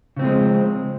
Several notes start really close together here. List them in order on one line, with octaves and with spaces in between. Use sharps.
C#3 C4 F3 G#3